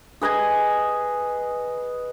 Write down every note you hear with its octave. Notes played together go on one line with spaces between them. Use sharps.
G#4 B4 D#5 G#5